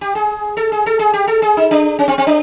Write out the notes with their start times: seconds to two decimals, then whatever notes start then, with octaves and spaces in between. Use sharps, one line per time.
0.01 G4
0.15 G#4
0.57 A4
0.72 G#4
0.86 A4
0.99 G#4
1.14 G4
1.27 A4
1.42 G#4
1.57 D#4
1.71 D4
1.99 C#4
2.08 C4
2.18 C4
2.27 D4